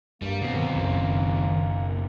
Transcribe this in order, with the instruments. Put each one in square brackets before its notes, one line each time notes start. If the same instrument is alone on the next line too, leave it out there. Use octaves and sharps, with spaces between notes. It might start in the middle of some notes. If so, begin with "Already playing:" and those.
[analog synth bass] G2 [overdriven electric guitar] G3 [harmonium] A#3
[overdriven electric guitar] D#2 C4 [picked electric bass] B2
[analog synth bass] D#3
[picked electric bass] F#1 B1 [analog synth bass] F#2